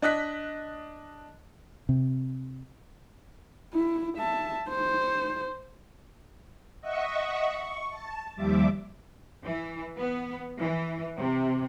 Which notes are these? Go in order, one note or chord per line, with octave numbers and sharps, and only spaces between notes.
D4 D#5 F#6 B6
C3
E4
E5 A5
C5
D#5 E5 F#5 C#6
C#6
A5
D#2 F3 G3 E5 D6
E3
B3
E3
C3